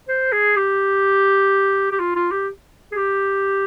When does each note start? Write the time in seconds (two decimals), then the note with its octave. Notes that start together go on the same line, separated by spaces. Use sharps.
0.09 C5
0.32 G#4
0.57 G4
1.92 G4
2.00 F4
2.16 F4
2.32 G4
2.92 G#4
2.95 G4